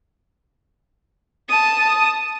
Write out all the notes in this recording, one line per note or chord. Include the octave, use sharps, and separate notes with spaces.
A5 D#6